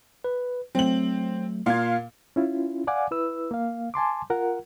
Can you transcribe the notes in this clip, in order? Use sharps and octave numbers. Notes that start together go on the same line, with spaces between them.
B4
F#3 A3 C4 F#7
A#2 F5 C6 G#6
C#4 E4 F4
D5 F5 F#5 G#5 D6
E4 B4 E6
A#3 F5
G#5 A5 C6 D6
F4 A#4 F#5